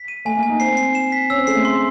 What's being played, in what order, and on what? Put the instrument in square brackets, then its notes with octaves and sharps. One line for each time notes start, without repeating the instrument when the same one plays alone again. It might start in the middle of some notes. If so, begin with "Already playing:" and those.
Already playing: [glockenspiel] B6
D#7
[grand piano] A3 [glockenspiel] G#5
[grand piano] A#3
[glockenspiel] G#5
[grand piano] D#4
[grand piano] C4 [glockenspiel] C7
[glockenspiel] C7
E7
B6
[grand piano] C#4 [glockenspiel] E6
[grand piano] C4
[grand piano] G#3 [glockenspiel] C7
[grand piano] A3
[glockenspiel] C6